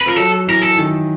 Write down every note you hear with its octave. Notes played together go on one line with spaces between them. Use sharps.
B4
F3 A#4
F#3 A4
E3 A#4
A4
D#3